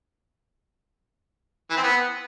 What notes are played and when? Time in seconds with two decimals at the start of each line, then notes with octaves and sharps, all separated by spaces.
1.71 E3
1.77 C4
1.83 B3